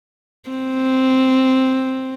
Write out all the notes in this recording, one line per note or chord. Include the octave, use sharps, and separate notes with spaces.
C4